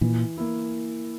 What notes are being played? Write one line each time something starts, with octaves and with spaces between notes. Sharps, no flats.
A#2 E3
A#3 E4